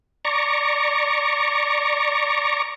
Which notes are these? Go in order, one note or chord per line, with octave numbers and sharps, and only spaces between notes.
D5 A#5 C#6